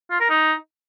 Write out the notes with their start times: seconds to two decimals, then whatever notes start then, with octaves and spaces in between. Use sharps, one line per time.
0.11 F4
0.20 A#4
0.30 D#4